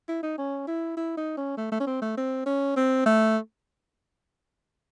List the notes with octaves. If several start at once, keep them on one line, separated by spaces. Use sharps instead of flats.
E4
D#4
C#4
E4
E4
D#4
C#4
A3
A3
C#4
C4
A3
C4
C#4
C4
A3